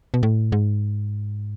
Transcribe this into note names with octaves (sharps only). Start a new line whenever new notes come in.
B2
A2
G#2